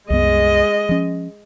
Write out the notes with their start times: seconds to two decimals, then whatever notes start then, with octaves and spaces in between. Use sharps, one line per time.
0.10 C2 F#2 G#3 B3 D#5
0.89 F3 C#4